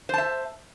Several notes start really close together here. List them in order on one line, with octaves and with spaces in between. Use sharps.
C5 A5 E5